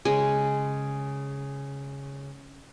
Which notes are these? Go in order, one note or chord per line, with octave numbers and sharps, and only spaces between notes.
C#3 G#3 G#5